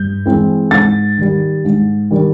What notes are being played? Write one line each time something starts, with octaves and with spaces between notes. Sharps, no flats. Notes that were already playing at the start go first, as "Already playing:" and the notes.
Already playing: G2 G6
E3 G#3 C4
G#2 A6
D#3 G3
G#2
D#3 G3